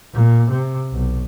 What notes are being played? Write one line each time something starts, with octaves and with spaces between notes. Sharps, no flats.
A#2
C3
B1